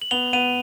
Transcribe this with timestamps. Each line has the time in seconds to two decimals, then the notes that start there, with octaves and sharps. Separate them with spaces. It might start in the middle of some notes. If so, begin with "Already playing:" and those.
0.02 F#7
0.11 B3 F7 G7
0.33 B3 D#7 F7